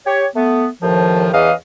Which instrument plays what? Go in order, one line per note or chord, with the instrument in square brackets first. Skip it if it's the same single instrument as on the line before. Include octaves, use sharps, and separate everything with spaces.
[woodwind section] G4 C#5
A3 B3
D#2 A2 D#3 F3
E2 C#3 E3 D#5 F5